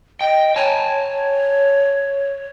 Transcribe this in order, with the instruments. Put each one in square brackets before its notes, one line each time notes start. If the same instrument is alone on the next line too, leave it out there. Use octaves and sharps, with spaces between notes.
[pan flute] D#5 [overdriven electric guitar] G5
[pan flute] C#5 [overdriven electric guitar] G#5 A5